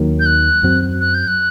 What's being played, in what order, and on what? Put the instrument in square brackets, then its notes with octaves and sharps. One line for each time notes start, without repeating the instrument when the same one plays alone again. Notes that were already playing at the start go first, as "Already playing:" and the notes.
Already playing: [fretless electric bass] D#2 D#3 F#3 A#3
[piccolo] G6
F#6
[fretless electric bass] F#2 F#3 C4
[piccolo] F#6
G6
F#6